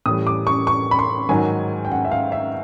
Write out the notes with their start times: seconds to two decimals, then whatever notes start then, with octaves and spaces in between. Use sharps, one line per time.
0.06 A2 E3 G3 D#6
0.27 D6
0.47 C#6
0.67 C#6
0.91 B5
0.99 C6
1.29 G#2 D#3 F#3 G#5
1.85 G5
1.92 F#5
2.05 E5
2.12 F5
2.32 E5